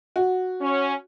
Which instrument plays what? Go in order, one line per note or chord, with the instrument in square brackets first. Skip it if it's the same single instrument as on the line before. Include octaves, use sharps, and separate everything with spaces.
[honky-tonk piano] F#4
[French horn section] C#4